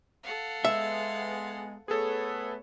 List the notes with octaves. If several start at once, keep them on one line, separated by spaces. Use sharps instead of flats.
A4 F5 F#5
G#3 B3 E5
A3 B3 G#4 A4 B4 C#5